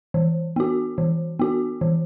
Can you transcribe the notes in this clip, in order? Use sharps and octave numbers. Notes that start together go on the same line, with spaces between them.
E3
B3 F#4
E3
B3 F#4
E3